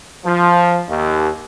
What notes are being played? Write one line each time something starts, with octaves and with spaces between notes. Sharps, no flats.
F3
D#2